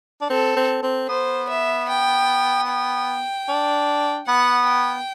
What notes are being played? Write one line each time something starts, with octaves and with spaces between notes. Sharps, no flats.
D4
C4 A4
C4
C4
B3 C5
E5
G5
G5
D4
B3 F#5
G5